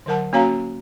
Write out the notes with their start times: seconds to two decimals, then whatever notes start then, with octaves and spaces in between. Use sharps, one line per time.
0.06 D3 F#3 A#4 F#5 A5
0.33 A#3 C#4 F#4 C#5 F5 A#5